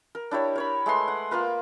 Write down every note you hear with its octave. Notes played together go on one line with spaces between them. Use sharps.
A#4
D4 E4 G4 C#5
A#4 C#5 B5
G#3 A3 B4 C6
F#5
A#3 F4 A#4 B4